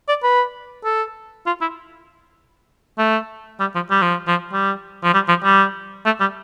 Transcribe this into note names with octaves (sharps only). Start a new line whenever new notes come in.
D5
B4
A4
F4
E4
A3
G3
F3
G3
F3
F3
G3
F3
G3
F3
G3
A3
G3